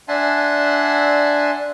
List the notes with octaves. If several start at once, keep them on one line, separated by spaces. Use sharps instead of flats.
D4 E5 F#5 G#5 A5 C6